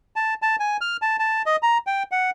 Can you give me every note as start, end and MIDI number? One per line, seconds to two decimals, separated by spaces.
0.16 0.34 81
0.42 0.56 81
0.60 0.77 80
0.81 0.97 89
1.02 1.17 81
1.19 1.42 81
1.46 1.56 75
1.63 1.78 82
1.87 2.03 79
2.12 2.30 78